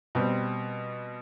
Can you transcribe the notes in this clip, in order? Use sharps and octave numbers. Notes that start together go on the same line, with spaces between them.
B2 G3 C4